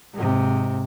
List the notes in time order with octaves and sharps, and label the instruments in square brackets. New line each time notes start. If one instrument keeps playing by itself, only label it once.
[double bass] G#2 C3